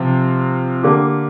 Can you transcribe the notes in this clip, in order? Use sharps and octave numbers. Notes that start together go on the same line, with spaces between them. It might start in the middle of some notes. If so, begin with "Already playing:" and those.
Already playing: C3 F3 C4 F4
D3 A#3 G4